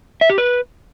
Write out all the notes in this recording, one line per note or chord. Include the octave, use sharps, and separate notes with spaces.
E5
G4
B4